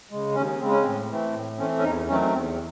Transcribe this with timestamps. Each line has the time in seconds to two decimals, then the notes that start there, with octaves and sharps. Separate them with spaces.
0.11 C#3 G#3
0.35 D#2 C#4
0.60 C#3 G#3 C4
0.71 C#4
0.82 A2 C4
1.10 E3 A3 C4
1.34 A2
1.59 E3 A3 C4 C#4
1.78 C#4
1.84 E2 D#4
2.09 D#3 F#3 A3 C4 C#4
2.33 E2 C4